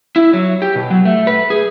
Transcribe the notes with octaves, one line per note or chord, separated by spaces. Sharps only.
E4
F#3
G4
B2
F#3
A3
B4
G#4